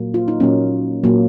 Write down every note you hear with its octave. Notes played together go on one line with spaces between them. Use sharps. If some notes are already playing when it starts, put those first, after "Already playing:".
Already playing: A#2 F#3 A#3
F4
D#4
A#2 F#3 A#3 C#4
A#2 F#3 A#3